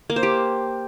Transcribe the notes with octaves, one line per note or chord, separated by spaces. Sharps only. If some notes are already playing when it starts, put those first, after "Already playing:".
A#3
C5
G4